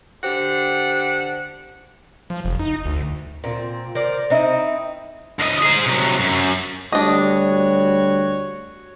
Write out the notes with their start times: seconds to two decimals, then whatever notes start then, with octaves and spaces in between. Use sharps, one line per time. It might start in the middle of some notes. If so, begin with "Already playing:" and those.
0.24 D3 G4 C5 F#5
2.30 F3
2.45 F1
2.59 D#4
2.86 D2
3.44 A#2 C4
3.95 A#4 C5 D5
4.30 C4 D#4 E4
5.40 D2 D#5
5.63 G#4 C5
5.86 C3 F#3
6.20 F#2
6.92 D2 G3 D4 F#4 C#5 D#5